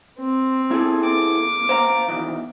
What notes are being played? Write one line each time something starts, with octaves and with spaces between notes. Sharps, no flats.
C4
E4 G#4 A4
D6
C5 F5 A#5
B2 D#3 E3